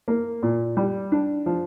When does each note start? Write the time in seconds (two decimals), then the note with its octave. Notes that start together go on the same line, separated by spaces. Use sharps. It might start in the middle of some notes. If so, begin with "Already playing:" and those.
0.08 A#3
0.43 A#2
0.77 G3
1.12 D4
1.46 F3